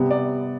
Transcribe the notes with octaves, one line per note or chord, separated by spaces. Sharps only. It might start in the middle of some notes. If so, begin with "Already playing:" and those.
Already playing: C3 G3 B3
D5